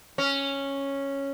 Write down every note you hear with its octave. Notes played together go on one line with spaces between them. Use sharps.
C#4